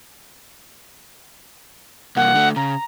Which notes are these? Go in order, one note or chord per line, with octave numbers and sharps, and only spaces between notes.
C2 A#3 F#5
D3 A3
C#3 A#5